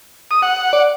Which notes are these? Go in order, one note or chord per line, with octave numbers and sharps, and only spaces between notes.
D#6
F#5
D5